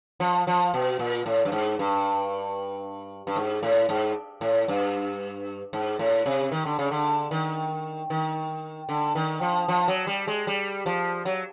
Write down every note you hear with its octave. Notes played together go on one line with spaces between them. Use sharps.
F3
F3
B2
A#2
A2
G2
G#2
G2
G2
G#2
A2
G#2
A2
G2
G#2
A2
C3
D#3
D3
C#3
D3
D#3
D#3
D3
D#3
F3
F3
F#3
G3
G#3
G3
F3
F#3